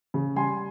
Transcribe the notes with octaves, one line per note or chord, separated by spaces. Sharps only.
C#3
G3 G#5 C6